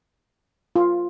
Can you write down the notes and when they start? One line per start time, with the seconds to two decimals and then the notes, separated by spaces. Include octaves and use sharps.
0.76 F4